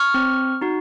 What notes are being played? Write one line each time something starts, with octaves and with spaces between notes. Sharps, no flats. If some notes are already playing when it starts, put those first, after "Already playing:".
Already playing: C#6 F6
C4
D#4 F#4